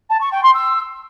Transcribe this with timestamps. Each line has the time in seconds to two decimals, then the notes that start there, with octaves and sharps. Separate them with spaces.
0.10 A5
0.21 C#6
0.32 G5
0.43 C6
0.54 E6